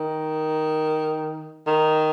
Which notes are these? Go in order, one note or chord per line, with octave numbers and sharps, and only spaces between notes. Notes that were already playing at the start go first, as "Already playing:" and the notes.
Already playing: D#3
D#3